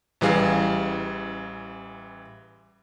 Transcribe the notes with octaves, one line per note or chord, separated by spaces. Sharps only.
A1 E3 G3 G#4 F5